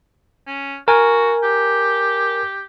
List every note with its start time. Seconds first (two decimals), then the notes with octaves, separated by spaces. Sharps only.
0.47 C#4
0.88 F#4 A#4 G#5
1.43 G4